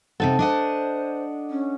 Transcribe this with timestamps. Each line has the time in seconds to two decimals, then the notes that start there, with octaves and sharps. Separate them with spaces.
0.20 C3 D#4 F#4 A4
0.39 D4 C5 D#5 F#5
1.50 C#4